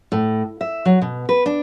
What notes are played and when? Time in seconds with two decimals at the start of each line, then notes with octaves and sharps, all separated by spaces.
0.12 A2
0.61 E5
0.85 F#3
1.02 B2
1.29 B4
1.46 D4